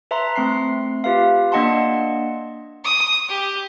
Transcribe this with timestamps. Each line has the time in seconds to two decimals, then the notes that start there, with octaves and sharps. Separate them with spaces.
0.11 B4 E5 A5 A#5 C6
0.36 A3 C4 C6 C7
1.04 F4 G4 B4 E5 F5
1.52 A#3 D4 D#5 F#5 A5 C6
2.84 D#6
3.28 G4